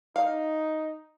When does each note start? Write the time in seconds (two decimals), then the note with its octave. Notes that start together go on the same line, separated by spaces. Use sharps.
0.16 D#4 F5